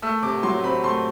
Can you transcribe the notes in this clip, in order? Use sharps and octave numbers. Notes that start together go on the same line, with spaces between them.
A3 E6
C3 D6
F#3 C6
C4 B5
A3 C6